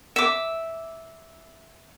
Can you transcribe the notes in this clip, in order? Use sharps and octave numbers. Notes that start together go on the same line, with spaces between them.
E5 D6